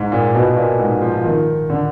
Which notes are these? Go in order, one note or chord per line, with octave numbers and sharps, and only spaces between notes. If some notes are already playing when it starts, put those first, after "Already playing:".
Already playing: G#2
A#2
B2
A#2
G#2
F3
D#3
D3